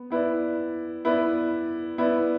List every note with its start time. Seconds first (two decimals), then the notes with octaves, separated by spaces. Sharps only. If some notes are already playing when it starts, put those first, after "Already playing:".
Already playing: B3
0.10 B3 E4 B4 D5
1.05 B3 E4 B4 D5
1.98 B3 E4 B4 D5